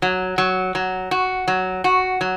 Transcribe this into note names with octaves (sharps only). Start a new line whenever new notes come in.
F#3
F#3
F#3
F#4
F#3
F#4
F#3